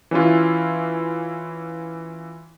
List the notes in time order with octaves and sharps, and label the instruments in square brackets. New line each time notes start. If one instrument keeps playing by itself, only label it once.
[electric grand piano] E3 C#4 E4 F4